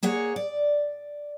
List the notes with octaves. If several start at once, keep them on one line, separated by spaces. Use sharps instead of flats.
A#3 G#4 C#5 F#5
D5